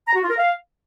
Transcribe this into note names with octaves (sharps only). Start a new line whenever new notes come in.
A#5
F#4
F4
A#4
F5